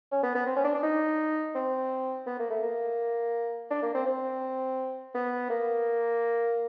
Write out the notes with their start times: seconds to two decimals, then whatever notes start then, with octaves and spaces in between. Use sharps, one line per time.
0.12 C#4
0.23 B3
0.35 B3
0.47 C4
0.56 C#4
0.64 D4
0.75 D4
0.83 D#4
1.55 C4
2.27 B3
2.39 A#3
2.50 A3
2.63 A#3
3.71 D4
3.83 A#3
3.95 C4
4.06 C4
5.15 B3
5.50 A#3